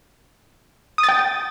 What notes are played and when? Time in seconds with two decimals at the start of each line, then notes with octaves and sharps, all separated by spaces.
0.98 D#6
1.03 A6
1.09 G5